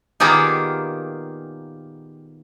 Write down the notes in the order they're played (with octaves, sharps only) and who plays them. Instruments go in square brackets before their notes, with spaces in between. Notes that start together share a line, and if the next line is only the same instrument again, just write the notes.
[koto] A#2 D#3 A#3 B3 G4 G#4